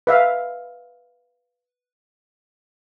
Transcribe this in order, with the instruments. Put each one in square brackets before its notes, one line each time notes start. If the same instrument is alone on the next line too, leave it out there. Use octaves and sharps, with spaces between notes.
[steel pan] B4 E5 F5